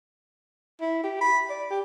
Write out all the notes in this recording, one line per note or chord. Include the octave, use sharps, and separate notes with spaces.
E4
G4
B5
D5
G4